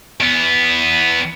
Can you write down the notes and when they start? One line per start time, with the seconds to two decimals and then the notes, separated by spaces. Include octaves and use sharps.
0.21 E2 B3